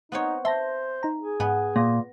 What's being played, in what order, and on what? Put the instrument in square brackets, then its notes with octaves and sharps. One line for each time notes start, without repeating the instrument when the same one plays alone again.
[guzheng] B3 C4 C#5 [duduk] D#4
[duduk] C5 [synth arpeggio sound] E5 A5 A#6 [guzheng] C6
[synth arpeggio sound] D#4 A#5
[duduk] G#4
[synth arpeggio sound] G#2 G#5 B5 [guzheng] B3
[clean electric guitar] A#2 [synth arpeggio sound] A#6